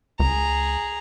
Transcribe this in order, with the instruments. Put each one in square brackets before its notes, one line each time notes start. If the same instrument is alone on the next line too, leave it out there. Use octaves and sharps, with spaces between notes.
[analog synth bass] C#2 [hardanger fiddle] G#4 A#5